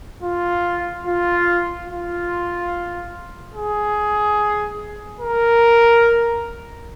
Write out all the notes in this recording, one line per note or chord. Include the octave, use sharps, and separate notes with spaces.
F4
F4
F4
G#4
A#4